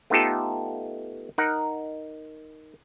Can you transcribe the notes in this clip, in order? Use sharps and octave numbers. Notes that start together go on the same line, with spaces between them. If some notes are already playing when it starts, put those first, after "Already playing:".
A3 B3 D#4 F4 G4 A4
D#4 A#4 F#5